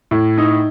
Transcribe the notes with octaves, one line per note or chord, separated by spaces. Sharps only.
A2
D#4